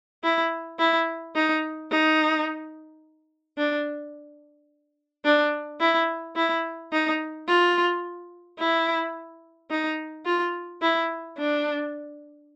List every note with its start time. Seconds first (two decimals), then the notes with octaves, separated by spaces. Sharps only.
0.24 E4
0.79 E4
1.35 D#4
1.91 D#4
3.58 D4
5.25 D4
5.80 E4
6.36 E4
6.92 D#4
7.48 F4
8.59 E4
9.71 D#4
10.25 F4
10.82 E4
11.38 D4